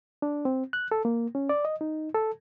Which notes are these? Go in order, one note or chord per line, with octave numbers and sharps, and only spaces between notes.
D4
C4
F#6
A4
A#3
C#4
D5
D#5
D#4
A4